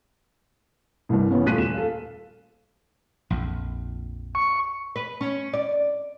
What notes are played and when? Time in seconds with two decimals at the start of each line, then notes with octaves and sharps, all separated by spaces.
1.09 C2 G2
1.30 C#3 E3 B3 C#4
1.46 D#1 A3 F4 F#6 B6 D#7
1.58 D#1 E7
1.74 A4 F5
3.30 A#1 F2
4.35 C#6
4.96 B4
5.21 C#4
5.53 D5